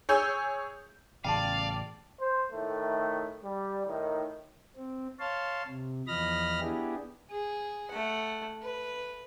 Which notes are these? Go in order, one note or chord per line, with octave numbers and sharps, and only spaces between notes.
G#4 C#5 E6 G6
A1 C#3 D5 F5 G5 A5
C5
A2 D#3 A3
G3
A2 D#3
C4
C#5 F5 A5 C6
C3
E2 F3 D#5 B5 F6 A#6
B3 D4 E4 G4 G#4
G#4
A3 F#5
B4